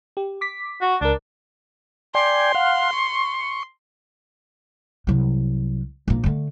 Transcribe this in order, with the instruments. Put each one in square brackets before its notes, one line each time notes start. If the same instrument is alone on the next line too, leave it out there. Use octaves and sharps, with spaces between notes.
[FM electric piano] G4
D6 B6
[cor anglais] F#4
[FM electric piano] C#2 A#4 [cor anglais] D4
[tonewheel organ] D5 G5 G#5 [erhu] C6
[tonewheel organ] F5 F#5
C#6
[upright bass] C2 F#3
A#1 A#3
D3 A3